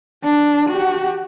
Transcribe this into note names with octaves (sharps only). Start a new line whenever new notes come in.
D4
F#4 G4